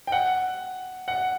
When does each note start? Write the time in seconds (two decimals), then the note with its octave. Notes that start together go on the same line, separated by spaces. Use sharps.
0.07 G5
0.12 F#5
1.08 F#5